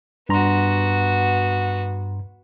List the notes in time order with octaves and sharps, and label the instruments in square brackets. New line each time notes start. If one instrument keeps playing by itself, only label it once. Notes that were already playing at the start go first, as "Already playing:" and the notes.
[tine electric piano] G2 A#5 C6 [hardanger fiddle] B3 F#4